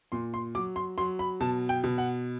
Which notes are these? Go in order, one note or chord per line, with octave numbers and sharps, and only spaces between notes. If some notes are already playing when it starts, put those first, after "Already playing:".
A#2 C6
C6
F#3 D6
C6
F#3 C6
B5
B2 A5
G5
B2
F#5